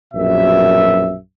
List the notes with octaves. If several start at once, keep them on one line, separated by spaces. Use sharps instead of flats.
A#1 F#2 B2 E5